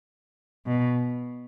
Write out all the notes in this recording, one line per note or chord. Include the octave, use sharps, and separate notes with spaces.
B2